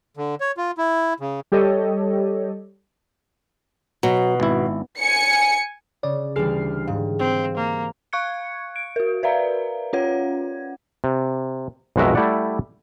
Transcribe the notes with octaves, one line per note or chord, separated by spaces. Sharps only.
D3
C#5
F4
E4
C#3
G3 G4 A4 C#5 D#5
B2 F#3
G#1 E4
G#5 C#7
C#3 C#5 D5
D2 E3 G3 G#4 F6 C7
G#2 F5
C4
A#3
F5 C#6 F#6 G#6 C#7
D7
F#4 A#4
A#4 B4 D5 E5 F5 A#5
C#4 F4 C#5 F#5 G#6
C3
B1 F2 G#3 F#4 A#4 E5
G3 A3 E4 G4 D5 F#5